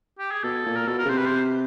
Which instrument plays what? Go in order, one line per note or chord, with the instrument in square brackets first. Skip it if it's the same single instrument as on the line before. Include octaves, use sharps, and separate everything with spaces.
[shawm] G4
G#4
[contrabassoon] B2 [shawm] A4
[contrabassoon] A#2
[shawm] A#4
[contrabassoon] B2 [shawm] A4
[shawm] A#4
[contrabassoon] C#3
[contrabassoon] C3 [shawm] C5
[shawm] B4
C5